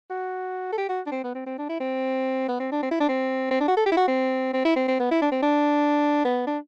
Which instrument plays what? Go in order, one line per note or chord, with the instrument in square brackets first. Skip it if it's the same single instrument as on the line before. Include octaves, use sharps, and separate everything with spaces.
[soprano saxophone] F#4
A4
G4
F#4
D4
C4
B3
C4
C4
D4
E4
C4
B3
C4
D4
C4
E4
D4
C4
C4
D4
F#4
A4
G4
E4
F#4
C4
C4
E4
C4
C4
B3
E4
D4
C4
D4
B3
D4